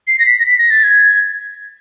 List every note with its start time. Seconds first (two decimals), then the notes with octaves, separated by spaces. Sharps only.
0.07 C7
0.19 A#6
0.26 B6
0.40 A#6
0.46 B6
0.58 A#6
0.70 A6
0.84 G#6